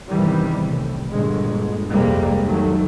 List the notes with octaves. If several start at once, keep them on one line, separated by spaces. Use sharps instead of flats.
E2 G2 C3 D#3 E3 G3
C2 A2
G1 A#2 G#3
C2 F2 C3 G3 G#3 A#3
F1 D#3 F#3 A3